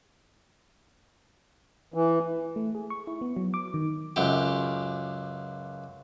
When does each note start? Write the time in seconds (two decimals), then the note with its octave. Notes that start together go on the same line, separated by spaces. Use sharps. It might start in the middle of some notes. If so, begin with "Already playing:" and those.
1.94 E3
2.56 A3
2.75 G#4
2.90 C#6
3.07 E4
3.21 B3
3.37 F#3
3.54 D6
3.74 D#3
4.16 C#2 F#2 G4